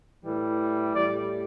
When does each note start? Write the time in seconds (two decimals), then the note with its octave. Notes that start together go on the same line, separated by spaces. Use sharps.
0.25 A2 E3 G3
0.95 A2 G3 D5